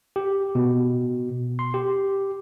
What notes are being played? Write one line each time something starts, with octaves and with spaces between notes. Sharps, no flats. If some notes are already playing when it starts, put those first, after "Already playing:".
G4
B2
C6
G4